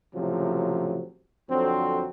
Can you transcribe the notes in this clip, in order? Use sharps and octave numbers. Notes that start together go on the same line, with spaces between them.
C#2 A2 C3 F3 F#3
F2 D3 F#3 C4